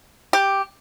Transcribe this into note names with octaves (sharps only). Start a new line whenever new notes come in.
G4